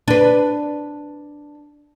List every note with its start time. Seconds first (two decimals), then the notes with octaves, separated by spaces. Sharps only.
0.08 D4 B4